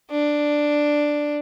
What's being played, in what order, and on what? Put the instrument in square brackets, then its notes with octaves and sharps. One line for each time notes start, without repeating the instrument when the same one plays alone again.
[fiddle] D4